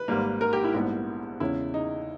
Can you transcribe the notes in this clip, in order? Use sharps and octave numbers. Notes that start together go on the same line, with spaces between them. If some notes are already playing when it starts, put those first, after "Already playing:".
Already playing: B4
G#1 G#2 G3 A#3
A#4
G4
E4
A#1 G#2 G3 B3
E2 C#3 G#3 C#4 E4
D#4